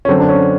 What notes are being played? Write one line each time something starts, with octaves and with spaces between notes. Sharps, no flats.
C#4
F#2 D3 C4
D4
C#4